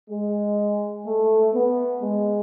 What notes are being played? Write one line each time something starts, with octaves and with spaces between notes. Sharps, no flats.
G#3
A3
B3
G#3